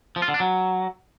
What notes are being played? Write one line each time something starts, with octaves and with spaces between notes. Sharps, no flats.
F3
F4
D3
D4
F#3